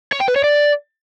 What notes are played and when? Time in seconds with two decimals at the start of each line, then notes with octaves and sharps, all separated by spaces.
0.13 C#5
0.20 G5
0.28 B4
0.36 C#5
0.44 D5